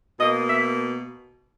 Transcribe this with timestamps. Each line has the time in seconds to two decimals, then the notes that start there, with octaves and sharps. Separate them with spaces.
0.17 B2 A#3 D#5
0.47 E5